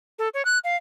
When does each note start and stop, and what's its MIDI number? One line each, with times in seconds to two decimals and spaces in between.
0.19 0.29 69
0.34 0.42 73
0.45 0.58 90
0.64 0.76 77